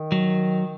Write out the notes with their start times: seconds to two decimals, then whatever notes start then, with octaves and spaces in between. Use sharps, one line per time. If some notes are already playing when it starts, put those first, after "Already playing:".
Already playing: D#3
0.12 F#3